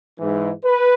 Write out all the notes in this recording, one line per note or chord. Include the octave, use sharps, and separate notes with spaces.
G#2 E3
B4